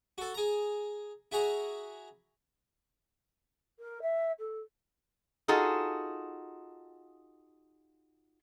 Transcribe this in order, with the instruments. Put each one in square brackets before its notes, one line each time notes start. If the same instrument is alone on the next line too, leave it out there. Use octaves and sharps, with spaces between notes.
[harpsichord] F#4 A4
G#4 A#5
E4 F#4 G#4 A#5
[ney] A#4
E5
A4
[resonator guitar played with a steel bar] D#4 F4 F#4 G#4 A4